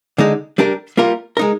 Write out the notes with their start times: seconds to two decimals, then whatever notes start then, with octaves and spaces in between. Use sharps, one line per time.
0.18 D3 G#3 D#4
0.58 G3 D4 G4 A#4
0.97 G3 A#3 F4 A#4
1.37 G#3 D#4 A#4